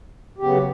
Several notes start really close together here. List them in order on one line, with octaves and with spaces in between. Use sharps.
G4 C#3 B3 F#3